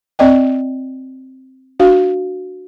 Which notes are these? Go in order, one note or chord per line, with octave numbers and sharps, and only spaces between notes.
C4 D5 D#5 G5
D4 F#4 F5